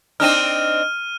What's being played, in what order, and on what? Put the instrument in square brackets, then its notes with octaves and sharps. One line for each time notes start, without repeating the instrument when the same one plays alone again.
[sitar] C4 D4 D#4 [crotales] F6 D#7